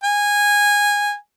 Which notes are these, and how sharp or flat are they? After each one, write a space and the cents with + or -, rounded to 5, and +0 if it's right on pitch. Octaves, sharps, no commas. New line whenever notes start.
G#5 -15